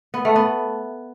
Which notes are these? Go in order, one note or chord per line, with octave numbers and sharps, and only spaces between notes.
B3
A3
B3